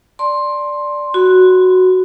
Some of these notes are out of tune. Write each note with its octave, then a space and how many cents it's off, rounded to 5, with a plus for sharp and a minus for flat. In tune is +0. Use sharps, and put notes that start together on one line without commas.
D5 +0 A5 +0 C6 +10
F#4 +0 B5 +35